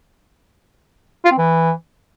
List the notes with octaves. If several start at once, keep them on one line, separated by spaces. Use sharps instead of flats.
F4
C4
E3